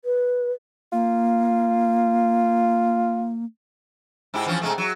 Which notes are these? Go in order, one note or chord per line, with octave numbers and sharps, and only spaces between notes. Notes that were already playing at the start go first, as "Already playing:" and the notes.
B4
A#3 F4
G#2 E4 G4
E3 F3 C#4
C3 G#3 A3
F#3